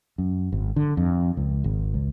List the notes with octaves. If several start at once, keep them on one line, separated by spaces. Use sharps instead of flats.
F#2
G#1
D3
F2
C#2
G#1
C#2